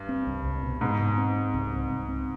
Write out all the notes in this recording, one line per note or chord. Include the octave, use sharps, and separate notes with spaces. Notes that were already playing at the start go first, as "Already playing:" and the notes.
Already playing: G2
C4
C2
C2
B2
G#2 B2
B2
C4
C4
C2
C4
C2
C4